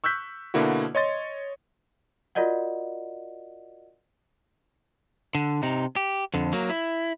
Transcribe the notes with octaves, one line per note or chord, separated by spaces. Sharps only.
C#6 E6 F#6 G6 B6
B2 D3 A#3 E4 F#4
C#5 D#5 C6 A6
F4 F#4 A#4 D5 D#5 F#5
D3
C3 D#4
G4
F2 D3
F#3 A#3
E4